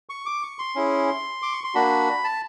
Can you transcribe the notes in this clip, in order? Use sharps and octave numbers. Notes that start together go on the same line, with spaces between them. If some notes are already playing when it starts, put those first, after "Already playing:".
C#6
D6
C#6
C6
C#4 E4 G#4
D6
C#6
C6
A#3 D4 F#4 B5
A5